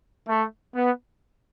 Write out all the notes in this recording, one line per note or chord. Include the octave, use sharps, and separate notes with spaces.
A3
B3